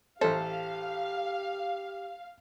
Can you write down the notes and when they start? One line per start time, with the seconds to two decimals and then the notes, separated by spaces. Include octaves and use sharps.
0.21 A1 G4 A4 C5 F5